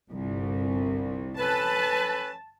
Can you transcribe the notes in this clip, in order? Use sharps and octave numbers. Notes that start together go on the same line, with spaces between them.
G1 C2
C#4 A4 B4 A5